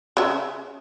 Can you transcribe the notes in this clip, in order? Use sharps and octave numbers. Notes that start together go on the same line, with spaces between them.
C#3 E5